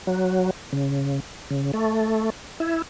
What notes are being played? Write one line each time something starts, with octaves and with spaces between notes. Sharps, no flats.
F#3
C#3
C#3
A3
E4